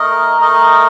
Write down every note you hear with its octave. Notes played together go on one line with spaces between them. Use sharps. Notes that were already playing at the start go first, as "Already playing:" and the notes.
Already playing: A3 D#4 A#4 D#5
A3 D#4 A#4 D#5